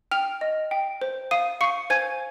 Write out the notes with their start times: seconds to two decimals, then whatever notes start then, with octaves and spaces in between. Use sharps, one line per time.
0.11 G5 F6 F7
0.41 D#5
0.71 G5
1.02 C5
1.31 F5 D#6 D#7
1.61 F5 C#6 C#7
1.90 C5 G#5 G#6